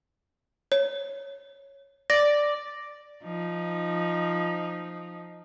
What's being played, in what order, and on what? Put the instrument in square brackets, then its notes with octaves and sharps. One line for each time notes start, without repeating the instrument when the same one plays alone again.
[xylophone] C#5
[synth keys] D5 [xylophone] A6 A#6
[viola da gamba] F3 D#4